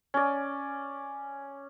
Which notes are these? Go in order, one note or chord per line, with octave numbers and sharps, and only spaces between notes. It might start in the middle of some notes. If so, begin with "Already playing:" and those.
C#4 D5